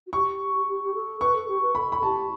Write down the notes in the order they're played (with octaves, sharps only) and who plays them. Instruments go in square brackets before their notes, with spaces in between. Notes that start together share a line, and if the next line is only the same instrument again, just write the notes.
[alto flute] F#4
[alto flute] G4 [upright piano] C#6
[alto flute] G4
G4
A4
[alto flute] B4 [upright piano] C#6
[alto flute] A4
G4
B4
[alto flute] A4 [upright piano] B5
[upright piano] B5
[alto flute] G4 [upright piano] A5